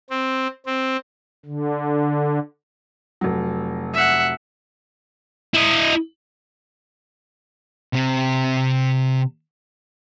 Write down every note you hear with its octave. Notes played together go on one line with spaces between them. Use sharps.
C4
C4
D3
F1 F#3
E5 F#5
E4 D#5
C3 C4